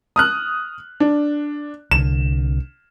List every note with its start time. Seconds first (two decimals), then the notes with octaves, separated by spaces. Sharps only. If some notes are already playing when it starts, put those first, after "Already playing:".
0.16 D#6 F6 F#6
1.00 D4
1.91 C2 D3 E7